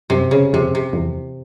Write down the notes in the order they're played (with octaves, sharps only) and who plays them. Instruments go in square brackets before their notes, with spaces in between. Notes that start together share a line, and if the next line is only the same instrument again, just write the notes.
[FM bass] F#2 [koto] C3
[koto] C#3
[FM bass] F2 [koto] C3
[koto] C3
[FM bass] F2
E2